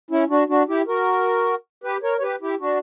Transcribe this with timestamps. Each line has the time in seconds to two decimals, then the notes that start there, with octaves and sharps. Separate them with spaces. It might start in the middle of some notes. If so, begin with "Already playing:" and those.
0.11 C#4 E4
0.30 D4 F#4
0.49 D4 F#4
0.68 E4 G4
0.88 F#4 A#4
1.84 G4 B4
2.03 A#4 C#5
2.18 C#5
2.22 G4 B4
2.41 E4 G4
2.60 D4 F#4